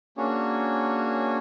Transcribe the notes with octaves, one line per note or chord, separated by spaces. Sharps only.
A#3 C#4 D4 F#4 G#4 C#5